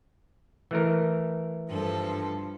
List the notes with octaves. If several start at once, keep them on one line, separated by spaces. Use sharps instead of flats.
E3 A3 A#4
G2 F3 A4